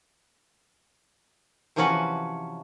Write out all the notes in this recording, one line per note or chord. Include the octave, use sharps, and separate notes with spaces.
C3 E3 F3 C#4 F#4 B4